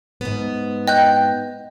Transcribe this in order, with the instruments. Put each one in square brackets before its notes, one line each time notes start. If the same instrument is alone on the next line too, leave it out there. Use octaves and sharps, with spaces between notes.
[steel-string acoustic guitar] G#2 B3
[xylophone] D#5 F#6 G6 [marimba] G5